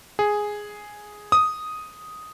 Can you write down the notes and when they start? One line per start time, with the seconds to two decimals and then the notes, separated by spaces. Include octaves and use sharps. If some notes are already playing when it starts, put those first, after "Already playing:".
0.19 G#4
1.32 D#6